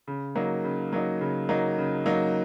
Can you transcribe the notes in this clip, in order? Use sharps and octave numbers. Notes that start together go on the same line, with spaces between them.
C#3
F#3 A#3 D#4
C#3
F#3 A#3 D#4
C#3
F#3 A#3 D#4
C#3
F#3 A#3 D#4